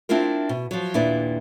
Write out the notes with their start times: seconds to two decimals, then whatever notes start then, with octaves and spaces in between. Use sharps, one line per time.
0.09 C4 D4 E4 F4 A#4
0.49 B2
0.71 F3 F#3
0.94 D#2 A#2 D4 E4 B4